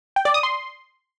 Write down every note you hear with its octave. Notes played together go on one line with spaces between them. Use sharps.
G5
D5
D#6
C6